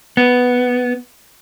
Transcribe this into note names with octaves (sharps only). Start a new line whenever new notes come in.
B3